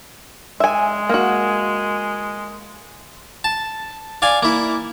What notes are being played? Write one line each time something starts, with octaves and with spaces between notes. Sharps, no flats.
G#3 E5 G#5
A#3 F#4
A5
D5 F5 G#5
A#3 E4